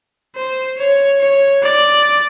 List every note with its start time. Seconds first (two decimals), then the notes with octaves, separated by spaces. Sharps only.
0.36 C5
0.78 C#5
1.20 C#5
1.63 D5